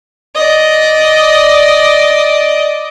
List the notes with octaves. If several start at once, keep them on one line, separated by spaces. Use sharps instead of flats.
D5 D#5